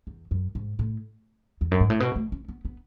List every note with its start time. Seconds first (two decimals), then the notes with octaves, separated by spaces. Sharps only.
0.07 E2
0.31 F#2
0.55 G#2
0.79 A2
1.61 E2
1.71 F#2
1.80 G#2
1.90 A2
2.00 B2
2.16 A3
2.32 C#4
2.48 B3
2.65 B3